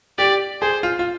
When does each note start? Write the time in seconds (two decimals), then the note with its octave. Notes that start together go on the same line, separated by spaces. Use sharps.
0.18 G4 D5
0.62 G#4 C5
0.83 F4
0.99 F4